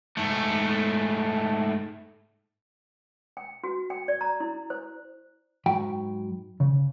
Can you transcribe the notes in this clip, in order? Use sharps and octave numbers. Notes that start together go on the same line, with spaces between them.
G#2 A3
G5
F#4
G5
D5
A#5
E4
C5
G#2 F#3 G5 B5
C#3